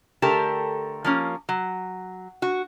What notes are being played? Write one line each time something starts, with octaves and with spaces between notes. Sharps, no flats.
D3 A3 G4 A#4 A5
F3 A#3 C#4
F#3
F#4